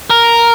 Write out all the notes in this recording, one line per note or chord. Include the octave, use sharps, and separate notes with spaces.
A#4